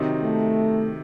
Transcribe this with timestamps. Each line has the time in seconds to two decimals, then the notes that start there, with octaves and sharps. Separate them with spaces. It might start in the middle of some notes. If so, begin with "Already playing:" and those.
Already playing: C3 D#3 F#3 C4 D#4
0.22 A3